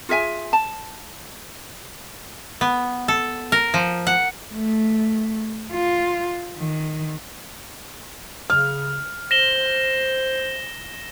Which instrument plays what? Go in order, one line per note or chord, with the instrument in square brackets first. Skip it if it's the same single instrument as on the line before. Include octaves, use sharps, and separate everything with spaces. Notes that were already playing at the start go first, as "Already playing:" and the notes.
[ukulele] F4 G#4 E5 G#5
A5
[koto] B3
A4
A#4
F3
F#5
[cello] A3
F4
D#3
[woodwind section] C#3 [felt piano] F6
[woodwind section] C5 [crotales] A#6 E7 G7